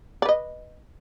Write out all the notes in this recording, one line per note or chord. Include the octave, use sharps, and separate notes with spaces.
B4 D5 D#5